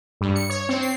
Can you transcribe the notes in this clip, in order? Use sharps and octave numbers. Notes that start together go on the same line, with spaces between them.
G2
C#7
C#5
C4
C7